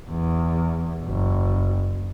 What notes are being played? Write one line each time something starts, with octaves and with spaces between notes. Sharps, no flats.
E2
F#1